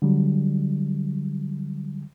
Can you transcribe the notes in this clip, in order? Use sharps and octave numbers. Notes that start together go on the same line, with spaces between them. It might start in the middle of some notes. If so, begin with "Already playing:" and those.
D3 F#3 G3